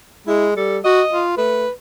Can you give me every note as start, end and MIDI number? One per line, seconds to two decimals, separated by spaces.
0.27 0.54 56
0.27 0.47 64
0.57 0.79 55
0.57 0.78 69
0.84 1.02 66
0.84 1.22 75
1.10 1.37 65
1.37 1.66 57
1.37 1.71 71